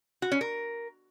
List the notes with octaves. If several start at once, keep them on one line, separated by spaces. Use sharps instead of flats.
F#4
C#4
A#4